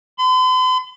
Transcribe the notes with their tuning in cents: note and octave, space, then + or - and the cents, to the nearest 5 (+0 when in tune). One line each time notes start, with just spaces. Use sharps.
C6 -45